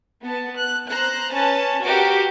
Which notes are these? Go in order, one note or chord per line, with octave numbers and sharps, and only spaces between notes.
B3 A5
F#6
C5 A#5 F#6
C#4 B4 A5
F#4 G4 A#4 D6